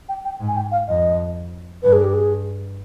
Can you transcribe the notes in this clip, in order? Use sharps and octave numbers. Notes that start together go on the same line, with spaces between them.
G5
G5
G#2
G#5
G5
F5
F2 D#5
G2 B4
G#4
G4
G#4